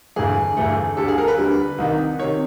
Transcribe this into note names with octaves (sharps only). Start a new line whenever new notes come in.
G1 G2 E3 A3 G#4
G1 G2 E3 A3
D2 D3 G3 A4
G#4
A#4
B4
D2 D3 G3
C2 C3 D#3
C3 D#3 C#5